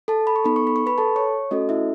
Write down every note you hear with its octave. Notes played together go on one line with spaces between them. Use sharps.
A4 A5
B5
C#6
B3 D#4 A4 B5
C#6
B5
C#6
B4 B5
A4 A5
C#5 C#6
A3 C#4 F#4 A4 D#5
E4 E5